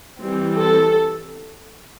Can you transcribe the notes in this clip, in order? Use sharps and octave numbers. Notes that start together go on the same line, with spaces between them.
E3 G3 C4
A4